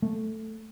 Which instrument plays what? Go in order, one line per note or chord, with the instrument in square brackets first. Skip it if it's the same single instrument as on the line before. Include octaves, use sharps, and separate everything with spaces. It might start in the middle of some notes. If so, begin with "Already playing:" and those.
[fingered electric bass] A3